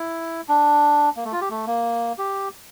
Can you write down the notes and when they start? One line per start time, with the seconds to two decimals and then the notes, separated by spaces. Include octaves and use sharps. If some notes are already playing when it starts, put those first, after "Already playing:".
Already playing: E4
0.48 D4
1.16 A#3
1.25 A3
1.32 F4
1.41 G4
1.50 A3
1.67 A#3
2.18 G4